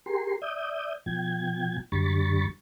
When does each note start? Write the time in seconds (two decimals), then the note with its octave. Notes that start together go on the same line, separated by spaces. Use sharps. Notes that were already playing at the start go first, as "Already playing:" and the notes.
0.06 G4 G#4 A#4 C6
0.42 D5 E5 D#6 G6
1.06 B2 F3 G5 G#6
1.92 F#2 D3 G3 B5 C#6 A6